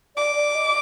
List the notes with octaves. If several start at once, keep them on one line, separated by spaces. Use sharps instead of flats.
D5 D6
D5
D#5